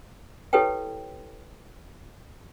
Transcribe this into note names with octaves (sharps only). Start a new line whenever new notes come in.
E4 G4 A4 B4 C#5 G5